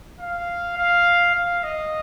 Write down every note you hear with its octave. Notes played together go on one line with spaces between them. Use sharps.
F5
F5
F5
D#5